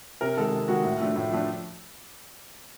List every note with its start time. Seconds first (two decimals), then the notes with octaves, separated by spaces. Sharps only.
0.21 C3 A#4
0.36 D#3 G#3 A4
0.52 C3
0.68 D#3 G#3 F#4
0.84 A2
1.00 F3 A3 D4
1.16 A2
1.31 F3 A3 D4